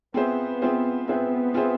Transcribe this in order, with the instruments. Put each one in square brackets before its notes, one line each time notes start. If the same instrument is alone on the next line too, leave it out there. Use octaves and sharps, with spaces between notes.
[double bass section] B3 [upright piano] C4 F4 G#4 C5 E5
[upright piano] C4 F4 G#4 C5 E5
[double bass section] B3 [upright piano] C4 F4 G#4 C5 E5
[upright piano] C4 F4 G#4 C5 E5